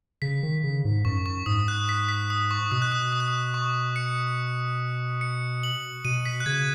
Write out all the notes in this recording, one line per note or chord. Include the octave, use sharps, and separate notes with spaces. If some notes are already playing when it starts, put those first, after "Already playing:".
C#3 B6
D#3
C#3
G#2
F#2 C#6
C#6
G#2 D#6
F#6
B6
B6
D#6
C#6
B2 D#6
F#6
D#6
D#6
F#6
D#6
C#6
C#7
C#7
F#7
B2 D#7
B6
F#6
C#3 G#6